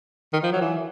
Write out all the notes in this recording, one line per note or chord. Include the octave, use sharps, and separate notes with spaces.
D#3
F3
F#3
E3